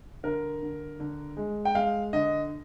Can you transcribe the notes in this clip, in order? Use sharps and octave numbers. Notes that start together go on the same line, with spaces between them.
D3 A#4
D3
D3
G#3
G5
G#3 F5
D3 D#5